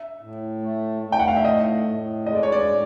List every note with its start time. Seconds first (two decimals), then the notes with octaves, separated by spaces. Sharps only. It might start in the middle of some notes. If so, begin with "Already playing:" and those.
Already playing: E5
0.21 A2
0.62 A3
1.03 A3
1.12 G5
1.20 F#5
1.28 F5
1.37 E5
1.44 A2 D#5
1.86 A2
2.27 G#3 D#5
2.35 D5
2.43 C#5
2.52 D5
2.67 A2